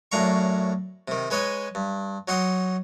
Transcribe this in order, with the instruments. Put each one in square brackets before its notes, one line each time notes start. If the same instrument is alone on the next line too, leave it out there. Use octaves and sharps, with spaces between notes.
[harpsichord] F#2 A2 D4 F5 A#5 C#6
C3 D#3
G#3 B4 C#5 D#5 G#5
G2
F#3 D#4 F#5 C6 D#6